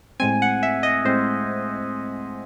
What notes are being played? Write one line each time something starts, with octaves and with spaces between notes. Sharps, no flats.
A2 G#3 C4 G#5
F#5
E5
D#5
A2 G#3 C4 C5